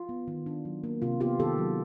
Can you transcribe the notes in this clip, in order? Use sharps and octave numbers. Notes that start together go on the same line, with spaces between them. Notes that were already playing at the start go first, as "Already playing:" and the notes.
Already playing: F4
B3
D#3
D4
F#3
A#3
C3 F4
B3 F4 G4
D#3 G4 A4
F#3